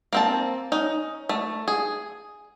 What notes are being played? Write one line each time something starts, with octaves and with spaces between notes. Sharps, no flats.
A#3 C4 A5
C#4 D#4
A3
G#4